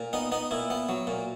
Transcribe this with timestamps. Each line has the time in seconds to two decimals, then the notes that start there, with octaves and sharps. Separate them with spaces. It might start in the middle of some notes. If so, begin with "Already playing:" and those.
Already playing: A#2
0.13 B3 D#4
0.32 B3 D#4
0.51 A#2 E4
0.70 B3
0.89 F#3
1.07 A#2